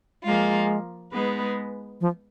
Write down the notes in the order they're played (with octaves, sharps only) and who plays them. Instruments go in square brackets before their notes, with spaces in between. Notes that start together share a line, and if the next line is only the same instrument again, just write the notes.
[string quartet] F3 A#3 F4 [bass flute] G#3
[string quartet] G#3 B3 D#4 G#4 B4
[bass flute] F3